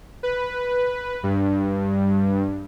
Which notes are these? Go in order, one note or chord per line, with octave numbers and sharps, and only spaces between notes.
B4
G2